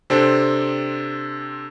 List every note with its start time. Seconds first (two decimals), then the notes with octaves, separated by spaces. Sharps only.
0.10 C3 C4 D4 A4